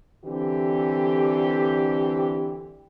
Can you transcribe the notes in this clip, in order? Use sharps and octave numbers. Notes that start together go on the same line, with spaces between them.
D3 E3 C4 G4